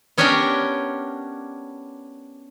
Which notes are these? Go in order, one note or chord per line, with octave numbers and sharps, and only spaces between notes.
B3 C#4 D4 G4 A#4 G5